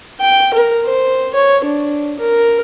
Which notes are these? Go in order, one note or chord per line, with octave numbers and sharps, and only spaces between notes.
G5
A#4
C5
C#5
D4
A#4